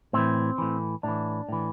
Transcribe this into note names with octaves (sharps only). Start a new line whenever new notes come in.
A2 E3 C4
A2 E3
A2 E3 D4
A2 E3